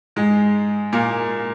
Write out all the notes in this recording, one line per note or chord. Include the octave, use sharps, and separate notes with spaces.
G#2 G#3
A#2 A#3